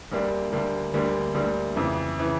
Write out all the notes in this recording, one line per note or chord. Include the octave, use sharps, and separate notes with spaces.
D2 D3 G3 A#3 D4
D2 D3 G3 A#3 D4
D2 D3 G3 A#3 D4
D2 D3 G3 A#3 D4
F2 C#3 E3
C#3 E3